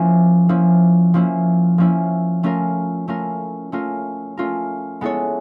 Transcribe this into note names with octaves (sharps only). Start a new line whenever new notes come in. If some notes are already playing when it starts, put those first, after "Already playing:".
Already playing: F3 A#3 C#4 E4
F3 A#3 C#4 E4
F3 A#3 C#4 E4
F3 A#3 C#4 E4
A3 C#4 F4 A#4
A3 C#4 F4 A#4
A3 C#4 F4 A#4
A3 C#4 F4 A#4
G#3 B3 E4 A4 C#5